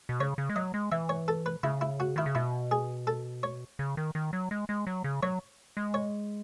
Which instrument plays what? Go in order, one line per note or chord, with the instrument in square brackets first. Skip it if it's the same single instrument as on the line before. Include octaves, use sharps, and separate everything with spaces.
[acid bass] B2
[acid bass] C#3 [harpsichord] C#5
[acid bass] C#3
G#3
[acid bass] F#3 [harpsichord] D#5
[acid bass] G#3
[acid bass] E3 [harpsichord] E5
[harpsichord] C#5
A4
B4
[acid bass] C#3 [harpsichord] E4
[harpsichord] E4
F#4
[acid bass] D#3 [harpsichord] E4
[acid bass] C#3
[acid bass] B2 [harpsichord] E4
[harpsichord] G#4
A4
C#5
[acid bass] C#3
D#3
D#3
F#3
G#3
G#3
F#3
C#3
[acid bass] F#3 [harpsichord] C#5
[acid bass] G#3
[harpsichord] C#5